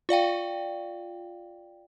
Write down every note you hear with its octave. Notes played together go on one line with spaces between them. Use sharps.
F4 D5 F5 G5